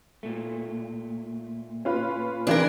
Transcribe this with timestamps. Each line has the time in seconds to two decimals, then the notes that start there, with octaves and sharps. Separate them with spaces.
0.23 A#2 A3
1.85 C#4 F4 B4
2.47 C#3 E3 C4 D4 A#4